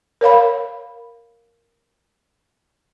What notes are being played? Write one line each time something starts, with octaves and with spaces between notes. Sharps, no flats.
A#4 C#5 F5 B5